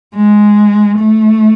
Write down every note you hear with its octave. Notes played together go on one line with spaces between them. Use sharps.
G#3
A3